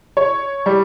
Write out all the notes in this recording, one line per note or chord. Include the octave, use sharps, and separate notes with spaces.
C#5
G3